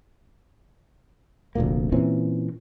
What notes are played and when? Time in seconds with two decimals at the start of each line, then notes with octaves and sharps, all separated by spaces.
1.55 F1 D2 A#2 A#3
1.92 A#2 E3 C4 C#4